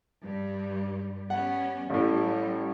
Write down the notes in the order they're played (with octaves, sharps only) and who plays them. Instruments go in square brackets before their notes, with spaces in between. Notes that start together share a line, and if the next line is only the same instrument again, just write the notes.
[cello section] G2 G3
[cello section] G3 B3 C#4 [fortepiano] F#5
[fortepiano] A1 A2 [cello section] G3